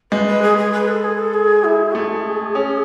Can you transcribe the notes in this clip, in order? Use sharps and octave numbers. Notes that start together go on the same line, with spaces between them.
G#3 B4
B4
G#4
G#4
B4
A4
G#4
A4
G#4
E4
A3 G#4
C#4